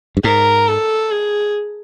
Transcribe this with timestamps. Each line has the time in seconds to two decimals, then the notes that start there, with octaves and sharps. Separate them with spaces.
0.17 G2
0.24 G#2 A#4
0.68 A4
1.11 G#4